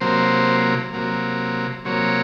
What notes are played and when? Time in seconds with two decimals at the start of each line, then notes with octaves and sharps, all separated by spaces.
0.01 C3 F#3 A#3 C5
0.93 C3 F#3 A#3
1.85 C3 F#3 A#3 C#5